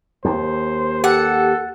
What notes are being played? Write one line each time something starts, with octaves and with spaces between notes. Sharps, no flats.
D#2 C5
G4 A4 F#5